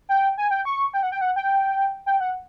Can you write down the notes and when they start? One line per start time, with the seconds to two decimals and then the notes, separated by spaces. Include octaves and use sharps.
0.09 G5
0.38 G#5
0.51 G5
0.65 C#6
0.94 G5
1.03 F#5
1.12 G5
1.21 F#5
1.36 G5
2.06 G5
2.20 F#5